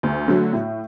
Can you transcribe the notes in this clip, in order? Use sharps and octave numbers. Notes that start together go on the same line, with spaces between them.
D2
D3 F#3 A3
A2